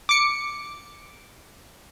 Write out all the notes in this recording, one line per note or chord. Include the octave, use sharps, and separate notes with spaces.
D6 C#7